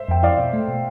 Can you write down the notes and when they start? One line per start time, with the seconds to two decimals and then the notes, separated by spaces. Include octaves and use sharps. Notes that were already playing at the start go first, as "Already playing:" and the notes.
Already playing: C5 E5
0.08 F2 G5
0.23 E4 D5 F5
0.38 B2
0.53 A3
0.68 B2